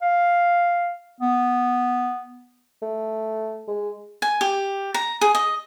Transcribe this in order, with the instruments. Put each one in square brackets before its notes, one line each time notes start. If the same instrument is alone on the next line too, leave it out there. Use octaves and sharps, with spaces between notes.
[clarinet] F5
B3
[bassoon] A3
G#3
[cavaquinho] G#5
G4
A#5
G#4
D#5